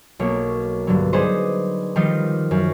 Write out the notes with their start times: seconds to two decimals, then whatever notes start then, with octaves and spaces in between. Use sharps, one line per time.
0.19 B1 A#3 C#5
0.87 G2 D3 F#3
1.13 D4 D#4 G#4 B4 C5 D#5
1.96 D#3 F3 G3 D#4 F4
2.51 F#2